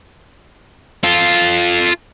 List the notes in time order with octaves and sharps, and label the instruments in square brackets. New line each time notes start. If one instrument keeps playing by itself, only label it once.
[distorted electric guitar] F4 A4